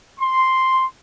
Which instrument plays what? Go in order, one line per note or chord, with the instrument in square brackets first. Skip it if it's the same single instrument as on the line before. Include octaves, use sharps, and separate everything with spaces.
[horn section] C6